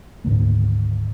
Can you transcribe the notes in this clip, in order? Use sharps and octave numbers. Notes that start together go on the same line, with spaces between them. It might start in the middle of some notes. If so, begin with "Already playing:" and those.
G#1 D2 A#3